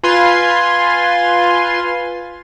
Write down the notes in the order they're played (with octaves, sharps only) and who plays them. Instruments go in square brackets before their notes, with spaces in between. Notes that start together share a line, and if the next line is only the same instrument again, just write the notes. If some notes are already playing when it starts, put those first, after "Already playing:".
[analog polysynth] F4 B4 G#5 C6